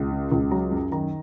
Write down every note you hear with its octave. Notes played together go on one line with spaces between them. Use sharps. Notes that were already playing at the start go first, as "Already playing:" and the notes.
Already playing: C#2
C#3
C#2
F#3 A#5
F#2
D#3 A#5